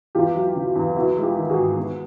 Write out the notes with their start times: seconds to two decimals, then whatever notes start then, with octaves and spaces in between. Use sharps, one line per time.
0.15 E2 F4 G4
0.35 F#3
0.55 C#3
0.75 E2
0.96 B3 E4 F#4
1.17 G#3
1.22 F4 G4
1.36 D#3
1.50 F#4 G#4
1.56 G#2
1.77 B3